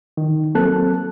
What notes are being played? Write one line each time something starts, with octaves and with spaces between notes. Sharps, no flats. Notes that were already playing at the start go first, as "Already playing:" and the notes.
D#3
F#3 A#3 C4 A4 A5 F#6